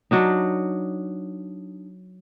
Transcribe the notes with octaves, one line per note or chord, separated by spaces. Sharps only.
F#3 D4 D#4